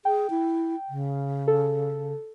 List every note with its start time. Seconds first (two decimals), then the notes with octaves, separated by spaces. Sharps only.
0.05 G#4 G5
0.30 E4
0.89 C#3
1.48 A4